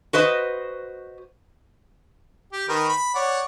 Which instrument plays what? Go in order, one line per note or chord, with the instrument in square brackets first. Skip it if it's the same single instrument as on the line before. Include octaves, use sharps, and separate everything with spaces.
[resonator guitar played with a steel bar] F#4 B4 C5 D#5
[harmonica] G4
D#3 A#4 B4
B5
C#5 D5 F#5